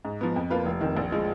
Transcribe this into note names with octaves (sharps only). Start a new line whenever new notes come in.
G#2
F3 B3
F2
F3 A#3 F4 B4
F1
F2 D#3
A#1
F3 G#3